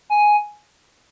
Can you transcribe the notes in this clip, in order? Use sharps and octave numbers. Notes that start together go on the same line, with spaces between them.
G#5